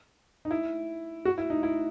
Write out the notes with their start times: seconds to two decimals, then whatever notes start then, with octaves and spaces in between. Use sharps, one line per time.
0.45 D#4
0.51 E4
1.25 F#4
1.38 E4
1.50 D#4
1.63 E4